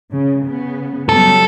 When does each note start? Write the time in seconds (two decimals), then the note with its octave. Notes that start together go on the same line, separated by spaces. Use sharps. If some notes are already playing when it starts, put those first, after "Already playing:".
0.12 C#3
0.43 C#3 B3
1.09 F#3 G3 B3 A4